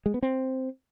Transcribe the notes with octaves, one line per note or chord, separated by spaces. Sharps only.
G#3
B3
C4